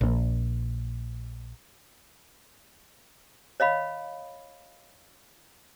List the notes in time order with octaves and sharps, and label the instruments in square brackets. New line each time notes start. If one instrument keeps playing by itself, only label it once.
[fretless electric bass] A#1 A#2
[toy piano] C#5 D#5 F5 B5